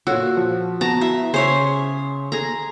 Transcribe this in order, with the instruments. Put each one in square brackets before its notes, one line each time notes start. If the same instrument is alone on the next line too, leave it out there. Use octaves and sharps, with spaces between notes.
[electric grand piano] A#2 F4 E6 [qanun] F#4 [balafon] A4 C#5 F#5
[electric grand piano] F3
[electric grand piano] B3 [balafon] F#4 [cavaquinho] A5 [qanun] A#5
[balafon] E4 [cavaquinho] E5
[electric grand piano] C#3 C#4 [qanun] G#4 [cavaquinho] C5 C#5 E5
[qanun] G#4 A#5 [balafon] A4